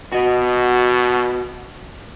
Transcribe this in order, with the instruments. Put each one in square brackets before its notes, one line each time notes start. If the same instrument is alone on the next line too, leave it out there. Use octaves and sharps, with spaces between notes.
[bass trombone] B2 [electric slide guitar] F#4 D#5